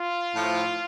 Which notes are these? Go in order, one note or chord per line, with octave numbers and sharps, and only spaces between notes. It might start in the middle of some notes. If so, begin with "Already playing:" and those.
Already playing: F4
A2 F3